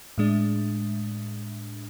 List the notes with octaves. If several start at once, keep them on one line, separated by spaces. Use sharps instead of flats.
A2 G#3 D4